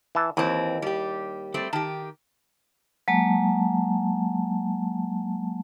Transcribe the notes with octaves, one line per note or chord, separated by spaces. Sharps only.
E3 A5
D#2 E3 C4
G3 G4
G3 A3 C4
D#3 G4 A5
F#3 G#3 A#3 A5